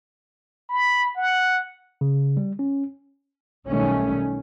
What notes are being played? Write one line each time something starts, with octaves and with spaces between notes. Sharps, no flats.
B5
F#5
C#3
G3
C#4
B1 D#3 G3 A3 C#4